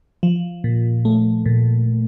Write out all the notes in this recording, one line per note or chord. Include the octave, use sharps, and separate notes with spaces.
F3
A#2
A3
A#2